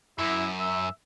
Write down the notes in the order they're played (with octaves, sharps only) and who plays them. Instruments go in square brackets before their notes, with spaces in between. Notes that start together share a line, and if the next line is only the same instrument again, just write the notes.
[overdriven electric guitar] F#2 [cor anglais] E4
[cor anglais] E5